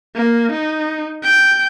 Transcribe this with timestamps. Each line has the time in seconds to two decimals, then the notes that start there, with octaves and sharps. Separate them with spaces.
0.15 A#3
0.52 D#4
1.23 G5